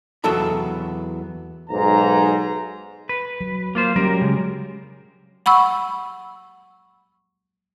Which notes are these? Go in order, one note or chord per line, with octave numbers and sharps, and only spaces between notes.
E2 F#3 B3 A4 A5 B5
B1 G#2 A#5
B4
F#3
A#3 F4 C5
F#3 G3 C#4 G4 A#4
C#3 G#3
F#5 B5 C#6 E6